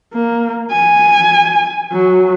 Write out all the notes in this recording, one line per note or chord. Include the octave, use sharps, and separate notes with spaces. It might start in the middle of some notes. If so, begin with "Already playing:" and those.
A#3
G#5
F#3